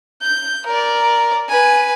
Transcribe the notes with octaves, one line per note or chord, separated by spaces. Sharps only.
G6
A#4 D5
B4 G#5